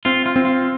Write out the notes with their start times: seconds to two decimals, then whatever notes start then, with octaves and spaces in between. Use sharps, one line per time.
0.05 C4 F4
0.26 F4
0.36 C4
0.45 F4